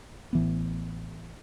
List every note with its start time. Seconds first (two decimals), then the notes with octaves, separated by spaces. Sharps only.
0.33 A1 E3 B3